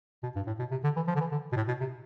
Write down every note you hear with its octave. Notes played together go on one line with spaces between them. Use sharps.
B2
G2
A2
B2
C3
D3
E3
F3
D3
E3
D3
B2
A2
B2
C3